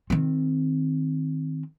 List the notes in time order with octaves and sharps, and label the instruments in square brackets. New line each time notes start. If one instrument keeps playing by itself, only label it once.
[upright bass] D#3 C4